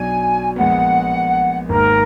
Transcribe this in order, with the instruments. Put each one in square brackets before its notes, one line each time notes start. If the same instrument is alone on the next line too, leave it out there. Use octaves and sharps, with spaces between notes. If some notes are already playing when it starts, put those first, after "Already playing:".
Already playing: [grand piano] B1 B2 F#3 D4 [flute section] G#5
[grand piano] A#1 A#2 G#3 B3 [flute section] F#5
[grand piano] G#1 G#2 D#3 A#3 [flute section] A#4